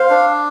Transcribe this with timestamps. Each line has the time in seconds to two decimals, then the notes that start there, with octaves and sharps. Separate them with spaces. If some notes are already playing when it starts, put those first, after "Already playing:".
Already playing: C5 F5
0.10 D4